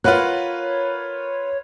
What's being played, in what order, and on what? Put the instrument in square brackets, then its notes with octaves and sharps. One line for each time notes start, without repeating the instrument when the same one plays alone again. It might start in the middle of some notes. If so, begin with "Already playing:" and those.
[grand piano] F4 B4 F#6 [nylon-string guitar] A#4 F#5 [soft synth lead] C#5